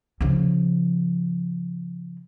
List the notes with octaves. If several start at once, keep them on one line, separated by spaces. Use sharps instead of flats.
C#3 F3